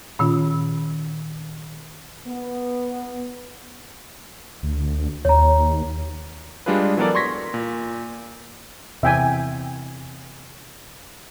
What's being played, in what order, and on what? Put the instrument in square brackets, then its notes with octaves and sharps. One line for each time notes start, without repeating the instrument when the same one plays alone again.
[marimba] A#2 D#3 C#4 F4
[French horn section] B3
[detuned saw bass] D2
[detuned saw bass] D#2 [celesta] C#5 A#5
[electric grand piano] G3 G#3 D4 F4 G#4 B4
E3 F#3 B3 A4 A#4 D5
C6 C#6 G#6 A#6 B6
A#2
[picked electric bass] E2 C3 E3 [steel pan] E5 G5 G#5